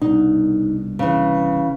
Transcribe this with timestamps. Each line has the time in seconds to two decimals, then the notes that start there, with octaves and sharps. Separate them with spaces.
0.02 C2 B2 D4 D#4
0.99 C#3 E3